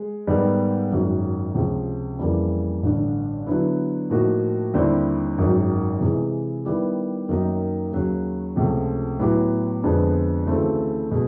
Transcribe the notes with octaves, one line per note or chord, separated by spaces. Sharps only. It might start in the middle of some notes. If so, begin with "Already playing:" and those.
Already playing: G#3
G#2 D#3 G3 B3 D#4
G#1 F#2 D#3 F#3
C#2 C3 F3
F2 C#3 E3 G3 A#3
A1 G2 D3
D3 F#3 B3 E4
A2 F3 A#3 D#4 F#4
D#2 D3 G3 C4 E4
G#1 F#2 D#3 F#3
C3 E3 G#3
D#3 G3 B3 E4 G4
F#2 D#3 F#3 A#3 D#4
D#2 C#3 F#3
C#2 C3 F3 A3
A2 F#3 B3 E4 G4
F2 D3 F3 G#3 B3
D2 C#3 E3 A3 C4
B2 G#3